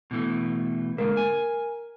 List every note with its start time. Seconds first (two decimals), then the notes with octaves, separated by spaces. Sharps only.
0.11 B2 E3 A3
0.98 D3 G#3 A#3 A#4
1.17 G#5